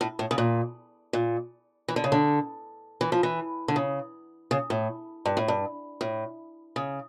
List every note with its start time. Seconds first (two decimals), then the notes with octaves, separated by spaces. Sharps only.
0.01 A2
0.19 A2
0.31 C#3
0.38 A#2
1.13 A#2
1.88 E3
1.96 D3
2.04 C#3
2.12 D3
3.01 E3
3.12 F3
3.23 E3
3.68 D3
3.76 C#3
4.51 C#3
4.70 A2
5.26 G2
5.37 A2
5.48 G2
6.01 A2
6.76 C#3